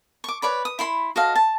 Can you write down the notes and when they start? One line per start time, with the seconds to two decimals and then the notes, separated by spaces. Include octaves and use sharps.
0.24 C#6 D6
0.42 B4 C#5 D5 B5
0.65 D#6
0.79 E4 B5 C6
1.16 F#4 A4 D#5 F5
1.35 A5